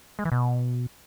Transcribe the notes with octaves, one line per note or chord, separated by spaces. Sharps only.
G#3
E3
B2